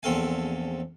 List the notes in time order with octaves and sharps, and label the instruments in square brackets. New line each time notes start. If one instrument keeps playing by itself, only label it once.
[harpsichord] A#1 E2 C4 A4 F5 G#5